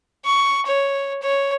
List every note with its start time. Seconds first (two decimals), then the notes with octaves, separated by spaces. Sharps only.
0.25 C#6
0.66 C#5
1.22 C#5